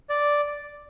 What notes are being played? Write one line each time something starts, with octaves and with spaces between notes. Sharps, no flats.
D5